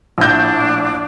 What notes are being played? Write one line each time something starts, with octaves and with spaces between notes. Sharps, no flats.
A#1 A2 D4 G6